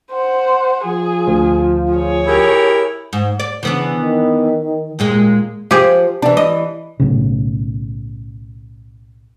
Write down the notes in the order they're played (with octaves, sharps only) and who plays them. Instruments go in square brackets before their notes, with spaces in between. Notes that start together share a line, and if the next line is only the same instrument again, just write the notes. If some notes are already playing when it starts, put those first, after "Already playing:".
[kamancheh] C5 F#5
[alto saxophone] F3 [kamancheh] G#4
[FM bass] D2
[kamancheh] G#4 C#5
[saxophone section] E4 G4 A#4
[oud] G#2
D5
[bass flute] C#3 [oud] E3 B3 D4
[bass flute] D#3
[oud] D#2 A#2 G#3
[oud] F3 [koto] G4 G#4
[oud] E3 D4
[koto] D#5
[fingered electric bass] B1 A2 C#3